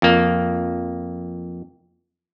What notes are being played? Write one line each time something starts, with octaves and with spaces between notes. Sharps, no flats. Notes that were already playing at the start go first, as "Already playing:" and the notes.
F2 A#3